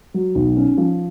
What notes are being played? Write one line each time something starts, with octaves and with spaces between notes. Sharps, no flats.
F#3
B1
C#4
F3